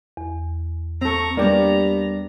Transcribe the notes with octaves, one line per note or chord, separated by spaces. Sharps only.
E2
C4 A4 A#5 C#6
G3 A#3 B3 D4 G4 A#5